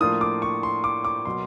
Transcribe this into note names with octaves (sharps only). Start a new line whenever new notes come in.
A2 F3 A#3 D4 F4 D#6
D6
C#6
C6
D6
D6
B2 F#3 A#3 C6